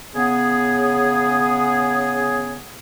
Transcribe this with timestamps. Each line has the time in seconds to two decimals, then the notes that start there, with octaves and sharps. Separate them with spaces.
0.16 C#3 B3 G#4